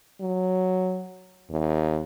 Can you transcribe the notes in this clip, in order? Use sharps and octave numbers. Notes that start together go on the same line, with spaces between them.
F#3
D#2